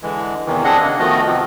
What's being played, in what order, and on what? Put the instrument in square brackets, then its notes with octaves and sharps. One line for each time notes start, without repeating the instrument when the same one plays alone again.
[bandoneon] D3 E3 G#3
E2 C3 D#3 E3
C4 D4 G#4 D#5 F#5
C#3 A#3
D#3 F3 A3 B3 F#4 D#5
C3 F3 C4